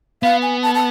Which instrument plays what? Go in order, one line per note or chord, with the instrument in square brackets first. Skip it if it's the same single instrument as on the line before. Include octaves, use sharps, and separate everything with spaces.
[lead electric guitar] B3 [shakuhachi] F5
[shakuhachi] G#5
A5
A5